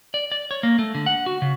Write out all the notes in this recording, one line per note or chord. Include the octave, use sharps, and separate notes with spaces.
D5
D5
C#5
A#3
A3
D3
F#5
F#4
C#3